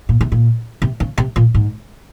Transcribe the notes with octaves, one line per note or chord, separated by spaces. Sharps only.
A#2
C3
A#2
C3
C#3
C3
A#2
G#2